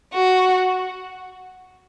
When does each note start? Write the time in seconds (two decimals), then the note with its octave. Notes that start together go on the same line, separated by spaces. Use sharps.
0.14 F#4